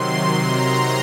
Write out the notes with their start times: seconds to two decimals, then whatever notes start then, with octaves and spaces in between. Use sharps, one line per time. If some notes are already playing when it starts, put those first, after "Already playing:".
Already playing: C3 D#3 F#3 C6
0.37 A#5